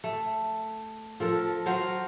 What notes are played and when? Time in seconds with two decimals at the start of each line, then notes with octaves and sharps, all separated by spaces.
0.04 A3
1.20 F3 A4 A#4
1.66 F#3 C5 F5